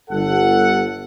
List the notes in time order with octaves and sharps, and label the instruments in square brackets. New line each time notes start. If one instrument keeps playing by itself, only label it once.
[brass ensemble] G1 A4 F#5